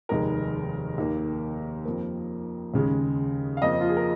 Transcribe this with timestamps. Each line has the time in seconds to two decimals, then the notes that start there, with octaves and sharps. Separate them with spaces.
0.09 F1 D#2 D#3 G#3 A#4
0.98 D#2 D#3 A#3
1.85 F2 F3 A#3
2.74 D#2 C#3 G#3
3.57 F5
3.62 F2 F3 A#3 D#5
3.81 F4
3.89 G#4
3.97 A#4